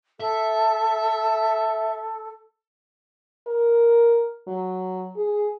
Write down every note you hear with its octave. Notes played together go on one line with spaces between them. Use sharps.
A4 E5
A#4
F#3
G#4